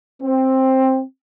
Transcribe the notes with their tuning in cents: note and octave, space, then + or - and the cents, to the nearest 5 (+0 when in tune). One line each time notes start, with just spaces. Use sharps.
C4 +10